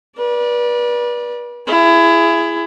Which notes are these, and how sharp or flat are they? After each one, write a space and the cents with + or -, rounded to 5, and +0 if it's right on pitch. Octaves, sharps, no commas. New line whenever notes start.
B4 -35 D5 +0
E4 +25 G#4 +0